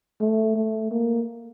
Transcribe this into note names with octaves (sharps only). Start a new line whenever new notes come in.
A3
A3
A#3